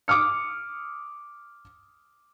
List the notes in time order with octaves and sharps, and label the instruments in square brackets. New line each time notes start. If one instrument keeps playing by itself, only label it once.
[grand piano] D6 D#6 F6 C#7